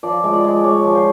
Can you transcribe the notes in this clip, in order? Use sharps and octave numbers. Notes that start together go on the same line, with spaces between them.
F3 D5
G#3
D5
G#3
G#3 C#5
F3
C5